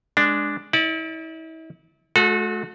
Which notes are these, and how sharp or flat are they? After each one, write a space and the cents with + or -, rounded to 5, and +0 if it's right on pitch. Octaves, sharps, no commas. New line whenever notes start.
G#3 +0 D4 +0
E4 -40 D5 +0
A3 -45 F#4 -30 A4 -5